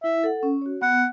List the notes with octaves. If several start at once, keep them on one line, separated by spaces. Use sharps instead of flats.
E4 E5
A4 F#5
C#4
F#4 C#5
B3 F#5